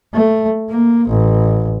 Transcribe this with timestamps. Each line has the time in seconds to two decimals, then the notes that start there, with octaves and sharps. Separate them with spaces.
0.14 A3
0.69 A#3
1.09 A1